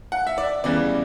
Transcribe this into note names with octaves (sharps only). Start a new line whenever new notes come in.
F#5
E5
D5
E2 C#3 E3 G3 D5